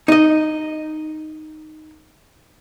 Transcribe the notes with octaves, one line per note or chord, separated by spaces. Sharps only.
D#4 D#5